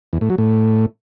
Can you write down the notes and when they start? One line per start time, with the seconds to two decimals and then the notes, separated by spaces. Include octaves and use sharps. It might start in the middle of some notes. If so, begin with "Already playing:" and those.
0.13 E2
0.21 A2
0.30 F#3
0.38 A2